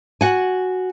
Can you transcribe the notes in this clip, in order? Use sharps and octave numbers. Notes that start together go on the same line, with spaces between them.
F#4 F#5 G#5